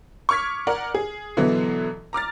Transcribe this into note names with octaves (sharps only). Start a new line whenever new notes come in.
C#6 D6 F6 G#6 B6
A#4 D5 F#5
G#4
B2 D3 E3 F#3 B3
A#5 D6 F6 A6